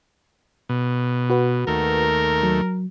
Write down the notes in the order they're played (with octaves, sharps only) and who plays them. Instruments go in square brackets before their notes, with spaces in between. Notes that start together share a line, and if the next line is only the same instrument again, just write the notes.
[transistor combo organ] B2
[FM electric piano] F#4 B4 F#5
[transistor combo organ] D#2 A3 [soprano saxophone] A#4
[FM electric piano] F#3